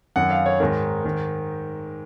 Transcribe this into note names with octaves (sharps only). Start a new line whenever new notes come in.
F#2 D#3 F#5
F5
C#5
G#2 D#3 A#4
G#2 D#3